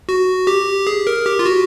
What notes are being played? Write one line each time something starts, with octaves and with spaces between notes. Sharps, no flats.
F#4
G4
G#4
A#4
G4
F4
F#4